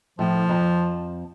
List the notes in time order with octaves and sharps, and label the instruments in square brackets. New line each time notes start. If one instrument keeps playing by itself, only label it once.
[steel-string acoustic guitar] A2 [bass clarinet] F3
[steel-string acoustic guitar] F2 A5